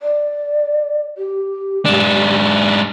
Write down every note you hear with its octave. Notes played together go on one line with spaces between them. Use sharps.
D5
G4
G#2 D4